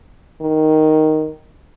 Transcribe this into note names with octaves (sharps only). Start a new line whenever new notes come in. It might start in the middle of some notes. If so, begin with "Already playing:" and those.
D#3